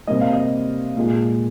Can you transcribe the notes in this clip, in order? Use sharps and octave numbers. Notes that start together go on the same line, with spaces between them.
C3 G3 A#3 D#5
F5
D#5
A#2 G#3